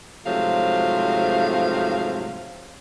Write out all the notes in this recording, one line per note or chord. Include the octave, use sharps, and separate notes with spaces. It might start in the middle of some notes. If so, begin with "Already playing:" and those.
G#2 C3 F3 F#3 A3 F5